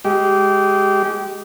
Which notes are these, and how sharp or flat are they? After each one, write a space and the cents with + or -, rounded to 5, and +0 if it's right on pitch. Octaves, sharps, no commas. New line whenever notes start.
G#3 +0 G4 -20